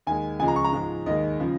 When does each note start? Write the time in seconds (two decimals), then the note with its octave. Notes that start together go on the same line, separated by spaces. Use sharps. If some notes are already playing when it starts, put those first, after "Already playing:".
0.07 D#2 D#3 G#3 G#5
0.40 C#2 C#3 F3 G#3 G#5
0.48 A#5
0.56 C#6
0.64 A#5
0.73 G#2 F3 G#3
1.06 D#2 D#3 G#3 D#5
1.40 C#3 F3